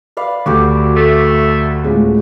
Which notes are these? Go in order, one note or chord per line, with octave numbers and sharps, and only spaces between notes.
B4 D5 F5
D2 F#4 G4 A4
A3
C#2 A2 G#3